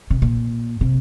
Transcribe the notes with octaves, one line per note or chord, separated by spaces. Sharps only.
C3
A#2
C3